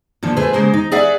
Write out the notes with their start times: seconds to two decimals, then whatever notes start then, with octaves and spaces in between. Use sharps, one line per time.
0.23 A#2 D3 F3
0.36 A3 G#4 B4 C5
0.53 C#3 G#3 A#3 C5
0.73 D#4
0.91 G#4 D5 E5 F#5